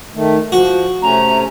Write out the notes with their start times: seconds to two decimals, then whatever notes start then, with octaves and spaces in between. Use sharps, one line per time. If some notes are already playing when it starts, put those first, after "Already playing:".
0.15 D#3 A3
0.52 F3 F#4
1.02 C3 A3 C#4 A#5